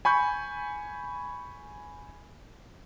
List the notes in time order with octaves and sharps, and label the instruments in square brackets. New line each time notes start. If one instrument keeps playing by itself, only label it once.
[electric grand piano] G#5 B5 C#6 G6